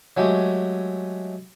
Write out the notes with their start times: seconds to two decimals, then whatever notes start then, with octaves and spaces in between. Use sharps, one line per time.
0.17 F#3 G#3 A3 G4